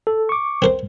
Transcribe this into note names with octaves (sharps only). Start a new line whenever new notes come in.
A4
C#6 D6
C4 A#4 C5